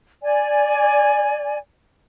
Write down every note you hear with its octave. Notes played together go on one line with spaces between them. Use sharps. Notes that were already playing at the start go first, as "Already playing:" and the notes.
D5 G#5